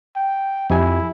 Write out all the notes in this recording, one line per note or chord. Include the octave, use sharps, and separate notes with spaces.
G5
F2 E4 G4 G#5